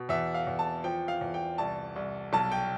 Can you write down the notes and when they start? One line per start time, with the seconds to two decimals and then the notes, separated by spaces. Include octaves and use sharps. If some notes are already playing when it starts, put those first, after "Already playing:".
Already playing: B2
0.09 E2 E5
0.34 F5
0.47 E2
0.59 A5
0.84 F3 G5
1.08 F5
1.21 E2
1.34 G5
1.58 C2 A5
1.96 C2
2.33 B1 A5
2.52 G5